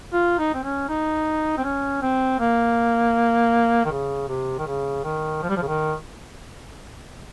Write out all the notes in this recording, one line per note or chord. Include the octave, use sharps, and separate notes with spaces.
F4
D#4
C4
C#4
D#4
C4
C#4
C4
A#3
D#3
C#3
C3
D#3
C#3
D#3
F3
G3
F3
C#3
D#3